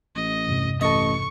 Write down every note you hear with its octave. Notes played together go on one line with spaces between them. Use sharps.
A1 D#5
E2 G2 C3
A1 A4 D#5 C#6